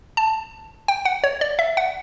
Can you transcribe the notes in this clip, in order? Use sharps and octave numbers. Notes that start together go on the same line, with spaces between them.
A5
G5
F#5
C#5
D5
E5
F#5